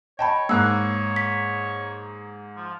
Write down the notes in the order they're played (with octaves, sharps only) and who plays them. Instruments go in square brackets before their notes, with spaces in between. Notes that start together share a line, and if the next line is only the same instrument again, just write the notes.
[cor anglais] C#5 [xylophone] D#5 A5 B5 [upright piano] G5
[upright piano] G#2 A#3 [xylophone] E6 F#6
[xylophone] B6
[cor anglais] F3